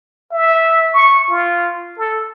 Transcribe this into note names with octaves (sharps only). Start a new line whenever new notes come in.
E5
C#6
F4
A4